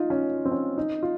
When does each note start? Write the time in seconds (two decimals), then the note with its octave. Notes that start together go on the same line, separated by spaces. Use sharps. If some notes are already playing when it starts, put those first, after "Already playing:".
Already playing: D#4 F4
0.10 C#4
0.45 C4
0.52 C#4
0.78 D#4
1.03 F4